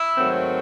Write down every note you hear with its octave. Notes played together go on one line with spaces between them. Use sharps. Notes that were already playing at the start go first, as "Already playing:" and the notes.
Already playing: E4
G#2 D#3 F#3 A3 C4